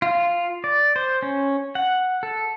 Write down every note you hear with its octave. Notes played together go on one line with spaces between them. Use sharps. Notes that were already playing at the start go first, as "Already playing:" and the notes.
F4
D5
C5
C#4
F#5
A4